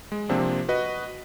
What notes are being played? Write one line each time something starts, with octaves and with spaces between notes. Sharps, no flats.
G#3
C3 F3 A#3 C4 D4
F#4 B4 D#5